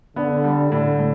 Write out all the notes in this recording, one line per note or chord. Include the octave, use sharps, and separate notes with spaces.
D3 B3
G3
A2 D3
A2